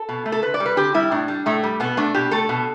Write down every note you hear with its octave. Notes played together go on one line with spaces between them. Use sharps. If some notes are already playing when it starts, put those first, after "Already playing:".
Already playing: A4
B2
A3
A4
D3 B4
D5
G3
B4
D3 G4
G3 E4
A2 D4
G3
A2 A3
G3
B2 B3
A3 D4
B2 G4
A3 A4
B2